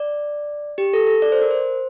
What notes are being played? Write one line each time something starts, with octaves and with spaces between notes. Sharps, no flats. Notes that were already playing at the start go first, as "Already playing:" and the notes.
Already playing: D5
G4
A4
A4
D5
C5
A#4
C5